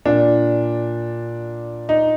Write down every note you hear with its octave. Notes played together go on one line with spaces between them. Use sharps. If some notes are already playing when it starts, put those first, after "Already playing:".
A#2 D4
D#4